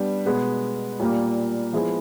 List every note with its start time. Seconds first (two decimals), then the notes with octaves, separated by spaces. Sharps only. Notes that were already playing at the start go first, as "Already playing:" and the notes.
Already playing: G3 B3 D4
0.25 B2 G#3 B3
1.00 A#2 G3 A#3
1.73 F3 G#3 B3 E4 G#4